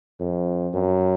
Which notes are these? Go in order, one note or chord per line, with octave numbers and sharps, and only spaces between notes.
F2
F#2